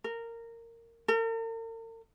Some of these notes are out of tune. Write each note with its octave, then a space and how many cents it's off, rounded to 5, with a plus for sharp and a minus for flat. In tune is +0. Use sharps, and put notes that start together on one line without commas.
A#4 -15
A#4 -45